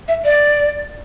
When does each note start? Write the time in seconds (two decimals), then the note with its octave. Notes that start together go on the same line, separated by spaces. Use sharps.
0.08 E5
0.25 D5